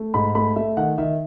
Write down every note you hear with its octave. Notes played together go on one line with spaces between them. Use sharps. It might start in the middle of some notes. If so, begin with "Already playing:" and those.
Already playing: A3
G#2 B5
A3 B5
A3 E5
D#3 F#5
D#3 E5